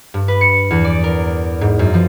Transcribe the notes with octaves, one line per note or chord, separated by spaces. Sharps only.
G2
B4
C#7
E2
D5
A#4
G#2
F#2
F3